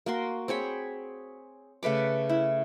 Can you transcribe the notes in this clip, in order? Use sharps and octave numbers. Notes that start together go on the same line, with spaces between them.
A#3 F#4 C6
C4 G#4 C#5 B5
C#3 A3 B4 D6
E4